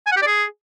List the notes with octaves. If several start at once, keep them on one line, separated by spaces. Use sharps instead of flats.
G#5
F#5
G4
D5
G#4